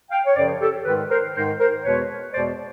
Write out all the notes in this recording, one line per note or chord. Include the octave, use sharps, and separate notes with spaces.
F5 G5
C#5
F#2 C#3 F3 C5 D5
G4 A4
G#2 D#3 G#3 A4 B4
A#4 C5
G#2 D#3 G#3 A#4 C5
A#4 C5
E2 B2 G#3 B4 C#5
E2 B2 G#3 C5 D5